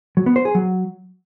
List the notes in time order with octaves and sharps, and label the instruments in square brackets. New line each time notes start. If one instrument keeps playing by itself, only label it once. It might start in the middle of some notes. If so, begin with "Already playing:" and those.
[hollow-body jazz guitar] F#3
B3
C5
G#4
F#3